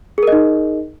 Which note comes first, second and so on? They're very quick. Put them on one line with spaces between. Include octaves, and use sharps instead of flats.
G#4 A#4 D#5 D#4